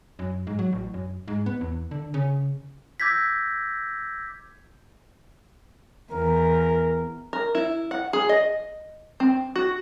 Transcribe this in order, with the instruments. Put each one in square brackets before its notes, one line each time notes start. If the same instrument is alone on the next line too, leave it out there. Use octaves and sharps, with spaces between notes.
[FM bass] F#2
G#2
F#3
A1
F#2
G#2
B3
E2
D3
C#3
[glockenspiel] D6 E6 G6 G#6 A#6 B6
[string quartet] E2 [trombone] A#4
[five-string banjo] A#4
E4
F#5
G#4
D#5
C4
F#4